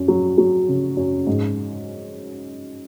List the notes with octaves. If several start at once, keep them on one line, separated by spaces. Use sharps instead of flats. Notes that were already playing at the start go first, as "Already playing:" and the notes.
Already playing: F#2
F#3
F#3
C#3
F#2
G#2